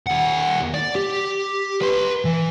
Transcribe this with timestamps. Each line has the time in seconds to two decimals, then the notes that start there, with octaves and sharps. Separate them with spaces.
0.07 D#2 F#5
0.74 D5
0.95 G4
1.82 B4 C6
2.25 E3